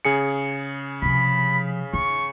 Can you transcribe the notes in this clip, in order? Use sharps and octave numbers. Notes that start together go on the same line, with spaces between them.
C#3 G#4 C#7
C3 F3 B5
D#4 C#6